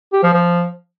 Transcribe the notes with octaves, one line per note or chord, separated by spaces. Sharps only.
G4
F3
F3